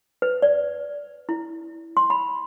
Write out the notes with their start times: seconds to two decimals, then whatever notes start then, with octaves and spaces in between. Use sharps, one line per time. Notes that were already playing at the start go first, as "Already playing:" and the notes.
0.22 B4
0.42 D5
1.29 E4
1.97 C6
2.10 B5